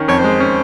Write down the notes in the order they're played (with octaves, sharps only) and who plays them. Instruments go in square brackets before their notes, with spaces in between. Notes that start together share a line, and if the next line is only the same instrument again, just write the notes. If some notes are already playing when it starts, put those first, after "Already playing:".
Already playing: [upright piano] D#3 C#4
[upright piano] F2 [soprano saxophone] C#5
[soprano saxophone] C5
[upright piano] G#3
C#4